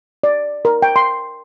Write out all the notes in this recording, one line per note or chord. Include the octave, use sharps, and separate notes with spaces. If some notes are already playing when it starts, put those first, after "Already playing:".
D5
A#4
G5
C6